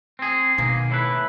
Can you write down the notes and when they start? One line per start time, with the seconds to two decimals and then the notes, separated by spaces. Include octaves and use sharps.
0.19 C4 G#4
0.58 B2 D#3 A#3 G#4
0.90 A2 E4 B4